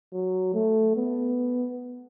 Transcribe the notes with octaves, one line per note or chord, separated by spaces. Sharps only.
F#3
A3
B3